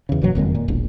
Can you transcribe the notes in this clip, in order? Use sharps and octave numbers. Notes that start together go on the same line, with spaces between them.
E2 C#3
F#1 B2 E3 F#3
F#1 F2 D#3 G#3
A#2
E1 A#1